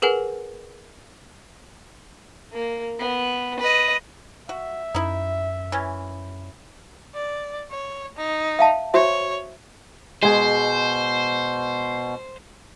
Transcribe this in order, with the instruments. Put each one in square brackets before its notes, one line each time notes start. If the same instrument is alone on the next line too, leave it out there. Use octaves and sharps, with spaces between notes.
[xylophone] G#4 A#4 B4 F#5 G#5
[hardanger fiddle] A#3
B3
B4 D#5
[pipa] F#4 [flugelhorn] E5
[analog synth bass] F#2 [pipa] D#4 E4
[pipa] E3 C#4
[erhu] D5
C#5
D#4
[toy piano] E5 F5 A5
[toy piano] F#4 C5 E5 [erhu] C#5
[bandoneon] B2 [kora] G#3 G#4 [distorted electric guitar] C5